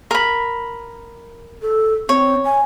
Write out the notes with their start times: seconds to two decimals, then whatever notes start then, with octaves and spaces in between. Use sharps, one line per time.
0.11 A#4 B5
1.62 A4
2.09 C4 C#5
2.45 G#5